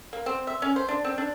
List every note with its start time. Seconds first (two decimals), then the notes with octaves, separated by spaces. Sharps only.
0.13 A#3
0.26 C4
0.47 E5
0.62 C#4
0.76 C5
0.88 D4
1.05 C4
1.18 D4